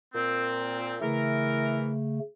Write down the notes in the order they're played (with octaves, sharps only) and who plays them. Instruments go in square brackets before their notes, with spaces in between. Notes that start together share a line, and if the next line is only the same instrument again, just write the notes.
[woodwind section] A#2 C4
[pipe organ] C#3 A3 [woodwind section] E3 A#4